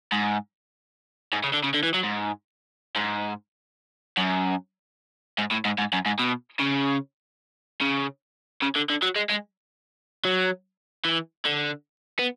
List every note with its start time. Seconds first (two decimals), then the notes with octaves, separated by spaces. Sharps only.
0.12 G#2
1.33 G#2
1.44 C#3
1.53 D3
1.64 C#3
1.74 D3
1.83 E3
1.94 F#3
2.03 G#2
2.96 G#2
4.17 F#2
5.38 G#2
5.51 A2
5.65 G#2
5.78 G#2
5.93 F#2
6.06 G#2
6.19 B2
6.60 C#3
7.81 C#3
8.62 C#3
8.75 D3
8.89 D3
9.02 F#3
9.16 G#3
9.29 G#3
10.25 F#3
11.05 E3
11.46 D3
12.19 B3